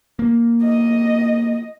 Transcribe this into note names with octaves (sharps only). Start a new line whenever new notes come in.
A#3
D#5